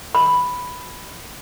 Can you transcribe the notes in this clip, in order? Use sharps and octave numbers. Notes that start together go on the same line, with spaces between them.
B5